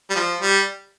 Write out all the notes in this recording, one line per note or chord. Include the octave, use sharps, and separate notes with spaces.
G3
F3
G3